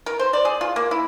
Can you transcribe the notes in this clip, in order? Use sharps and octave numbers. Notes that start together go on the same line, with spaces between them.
A#4
C5
D5
G#4
F4
A#3
E4